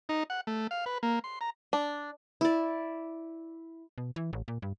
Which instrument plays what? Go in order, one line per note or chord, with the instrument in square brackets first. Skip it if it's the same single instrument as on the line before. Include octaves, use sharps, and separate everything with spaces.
[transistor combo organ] D#4
F#5
A3
F5
B4
A#3
C6
A#5
[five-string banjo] D4
[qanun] E4 D5
[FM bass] B2
E3
A1
A#2
G2